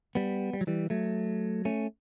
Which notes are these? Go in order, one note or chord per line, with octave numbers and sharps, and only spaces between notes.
G3 B3
G3
F#3
E3 G3
F#3 A3
A3 C#4